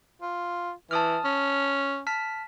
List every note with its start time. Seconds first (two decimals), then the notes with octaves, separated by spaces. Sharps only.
0.22 F4
0.91 E3 A5 D#6 F6
1.24 C#4
2.07 A5 F6 B6